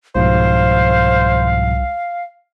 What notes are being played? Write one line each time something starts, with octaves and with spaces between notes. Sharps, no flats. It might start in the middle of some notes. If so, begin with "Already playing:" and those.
C2 G#2 B2 F3 C5 F5